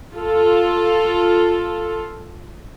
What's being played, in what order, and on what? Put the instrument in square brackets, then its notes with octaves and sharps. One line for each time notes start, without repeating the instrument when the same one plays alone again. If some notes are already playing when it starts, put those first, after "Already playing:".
[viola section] F4 A4